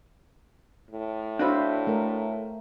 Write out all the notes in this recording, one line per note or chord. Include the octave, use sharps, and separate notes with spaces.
A2
D4 F#4 B4 C5 E5 F5
A3 A#4